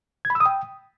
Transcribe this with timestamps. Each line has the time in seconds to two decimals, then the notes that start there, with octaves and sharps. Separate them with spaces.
0.25 G#6
0.30 B5
0.35 E6
0.40 D#6
0.46 G5